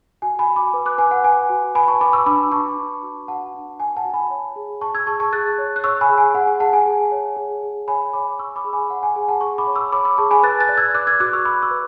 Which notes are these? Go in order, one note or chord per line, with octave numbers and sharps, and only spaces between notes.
F#4 G#5
G#5 B5
F#4
B5 D6
B4
D6 F#6
B4 G#5
F#5
B4 G#5
F#4
B4 G#5 B5
A5 C#6
B4 B5 D6
C#6 E6
D4 B5 D6
D4 A5 C#6
D4
F#4
F#4 F#5 A5
D4
F#4 G#5
F#5 A5
F#4
G#5 B5
C#5
G#4
G#4 A5 C#6
E6 G#6
G#4 A5 C#6
A5 C#6
G#4 F#6 A6
C#5
F#6
C#5 C#6 E6
G#5 B5
G#4
G#5
G#4 F#5
G#5
G#4 F#5 A5
G#5
G#4
C#5
G#4
G#4
C#5 G#5 B5
C#5 B5 D6
C#5 C#6 E6
B5 D6
G#4
G#5 B5
C#5 F#5
G#5
G#4 G#5
F#5 A5
G#4 A5 C#6
B5 D6
C#5
C#6 E6
C#5 B5 D6
B5 D6
G#4 A5 C#6
G#5 B5
B4 F#6 A6
F#6 A6
D5
E6 G#6
D5 D6 F#6
E6 G#6
F#4 D6 F#6
C#6 E6
F#4 B5 D6
C#6 E6
B4